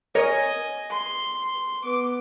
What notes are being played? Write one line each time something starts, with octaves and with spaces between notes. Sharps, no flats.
A#4 C#5 D#5 G#5
C6
B3 D6